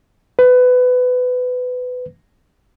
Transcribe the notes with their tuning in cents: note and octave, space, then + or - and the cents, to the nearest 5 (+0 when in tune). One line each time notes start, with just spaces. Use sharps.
B4 +20